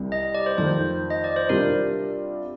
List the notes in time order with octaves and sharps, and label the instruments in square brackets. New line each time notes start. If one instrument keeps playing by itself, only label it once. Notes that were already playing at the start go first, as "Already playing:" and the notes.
Already playing: [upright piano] C2 C3 G3
[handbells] D#5
D5
C5
[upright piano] F2 D#3 A3 [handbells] C5
[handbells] D#5
D5
C5
[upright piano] C3 G3 D4 F4 [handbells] A#4